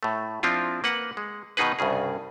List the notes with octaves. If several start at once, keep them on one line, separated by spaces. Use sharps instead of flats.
A2 A3
F3 C4 D4 E4 F4
A#3 B4 F#5
G#3
B2 D#3 D#4 G#4 B4
C2 G2 C#3 G#4